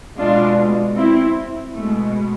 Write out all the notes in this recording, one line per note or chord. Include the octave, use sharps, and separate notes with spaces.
B2 G#3 D4 F4
C4 E4
B2 G#3 A3